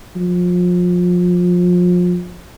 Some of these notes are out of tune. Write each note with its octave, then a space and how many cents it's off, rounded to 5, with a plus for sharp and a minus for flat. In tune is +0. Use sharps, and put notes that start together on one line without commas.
F3 +30